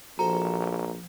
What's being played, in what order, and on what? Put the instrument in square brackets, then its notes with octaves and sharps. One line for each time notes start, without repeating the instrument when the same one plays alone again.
[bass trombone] A#1 [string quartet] F3 [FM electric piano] F#4 A4 C5 [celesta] A#5